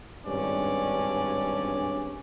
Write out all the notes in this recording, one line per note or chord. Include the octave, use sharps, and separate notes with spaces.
G#1 G2 C#4 D4 D5